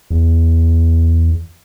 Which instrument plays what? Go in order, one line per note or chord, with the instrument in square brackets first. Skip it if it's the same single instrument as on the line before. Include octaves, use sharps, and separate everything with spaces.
[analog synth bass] E2